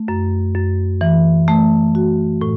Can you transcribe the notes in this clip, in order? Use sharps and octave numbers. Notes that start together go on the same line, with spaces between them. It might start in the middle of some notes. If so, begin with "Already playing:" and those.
Already playing: A3
F#2
F#2
E3
A3
F#4
A2